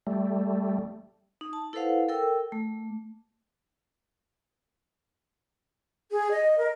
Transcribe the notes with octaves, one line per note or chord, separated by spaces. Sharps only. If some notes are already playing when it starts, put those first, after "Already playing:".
G3 A3
D#4
A5
E4 A4 B4 C5 F5 F#5
A4 A#4 G5 E6
A3
G#4
D#5
A#4